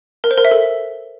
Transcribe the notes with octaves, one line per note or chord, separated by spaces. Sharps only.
A#4
C5
A#4
E5
A4